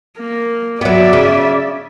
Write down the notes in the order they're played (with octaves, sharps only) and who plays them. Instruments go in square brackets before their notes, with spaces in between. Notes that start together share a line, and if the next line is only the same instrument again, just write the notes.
[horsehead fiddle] A#3
[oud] F#3 B3 [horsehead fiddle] D5 E5
[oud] C#3